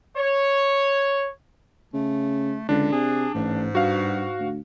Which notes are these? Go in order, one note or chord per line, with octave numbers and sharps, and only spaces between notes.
C#5
C#3 A3
C#2 D3 D4
C3 G#4
A1 G#2
G2 F#4 F5
D2